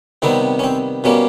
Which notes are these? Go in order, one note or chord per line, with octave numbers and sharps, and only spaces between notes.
C3 D#3 G3 B3 C4
C#4
C4
B2 G3 A#3 C#4